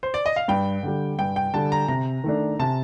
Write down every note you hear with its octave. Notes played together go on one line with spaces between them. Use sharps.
C5
D5
D#5
F5
G2 G5
D3 G3
G2 G5
G5
D3 G3 A5
A#5
C3 A#5
D#3 A3 D4
C3 A5